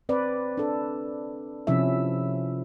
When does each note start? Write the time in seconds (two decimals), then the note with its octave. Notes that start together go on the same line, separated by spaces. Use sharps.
0.09 C4 B4 D5
0.57 D4 A4
1.67 C3 F3 C#4 E4 E5